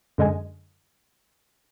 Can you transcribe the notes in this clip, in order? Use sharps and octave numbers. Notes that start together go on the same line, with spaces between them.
F#2 D3 G#3 D#5 G#5